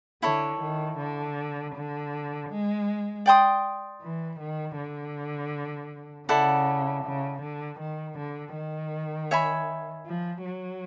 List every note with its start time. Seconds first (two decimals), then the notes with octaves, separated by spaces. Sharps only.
0.22 D3 E4 A4 C#5
0.61 D#3
0.98 D3
1.75 D3
2.50 G#3
3.26 D5 G5 C6 D#6
4.02 E3
4.40 D#3
4.77 D3
6.28 C#3 E4 A4 D5 F#5
7.04 C#3
7.42 D3
7.80 D#3
8.18 D3
8.55 D#3
9.31 C#5 E5 G#5 B5
10.07 F3
10.45 F#3